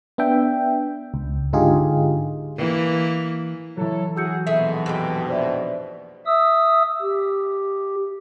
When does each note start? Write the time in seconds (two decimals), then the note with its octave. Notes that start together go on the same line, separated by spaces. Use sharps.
0.18 B3 D4 E5 G5
1.14 C#2
1.53 G#2 D3 D#4 F4 G4 G#4
2.56 E3 A#3
3.77 E3 F#3 E4 A4 C#5
4.17 F#4 G#4 E6 G6 C#7
4.47 A#1 G#2 B2 G#4 A4 E5
4.86 F2 G#3 G4
5.28 C5 D5 E5
6.26 E5 D#6 E6
7.02 G4